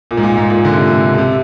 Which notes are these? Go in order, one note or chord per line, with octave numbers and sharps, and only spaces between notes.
A#2
G#2
A#2
G#2
A#2
D3
C3
A#2
C3
D3
C3